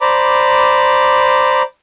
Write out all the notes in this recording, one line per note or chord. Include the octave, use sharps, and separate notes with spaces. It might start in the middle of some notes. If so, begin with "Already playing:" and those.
C5 D5 A#5 B5 D6